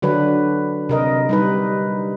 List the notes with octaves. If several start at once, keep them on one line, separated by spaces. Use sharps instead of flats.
D3 F#3 D4 B4
C3 A#4 D#5
G3 D#4 B4